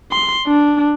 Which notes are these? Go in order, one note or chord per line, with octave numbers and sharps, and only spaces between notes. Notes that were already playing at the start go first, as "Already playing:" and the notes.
C6
D4